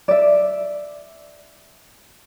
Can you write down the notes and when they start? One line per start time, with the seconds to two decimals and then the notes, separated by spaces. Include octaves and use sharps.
0.08 D5 E5